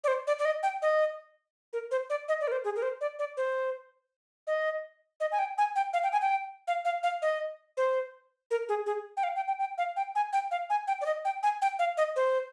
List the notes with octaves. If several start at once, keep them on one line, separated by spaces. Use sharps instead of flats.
D5
C5
D5
D5
D#5
G5
D#5
A#4
C5
D5
D#5
D5
A#4
C5
G#4
A#4
C5
D5
D5
C5
D#5
D#5
G#5
G5
G#5
G5
F5
G5
G#5
G5
F5
F5
F5
D#5
C5
A#4
G#4
G#4
G5
F5
G5
G5
G5
F5
G5
G#5
G5
F5
G#5
G5
D5
D#5
G5
G#5
G5
F5
D#5
C5